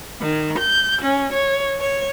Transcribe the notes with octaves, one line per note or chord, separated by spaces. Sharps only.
D#3
G6
C#4
C#5
C#5